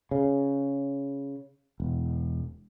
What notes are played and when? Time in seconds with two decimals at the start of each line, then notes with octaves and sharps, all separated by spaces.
0.11 C#3
1.80 E1